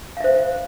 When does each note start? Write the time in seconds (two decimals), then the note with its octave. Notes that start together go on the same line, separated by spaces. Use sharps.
0.17 F5
0.20 E5
0.24 C5